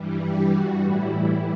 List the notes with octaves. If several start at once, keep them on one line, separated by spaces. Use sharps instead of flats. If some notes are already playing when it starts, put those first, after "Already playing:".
Already playing: G2 E3 G3
G4
F#4
A2 E3 G3 E4